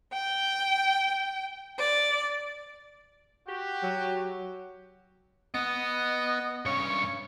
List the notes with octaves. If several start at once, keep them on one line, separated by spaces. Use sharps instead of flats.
G5
D5
F#4 G4
F#3
B3 D#5
G2 C#4 C#5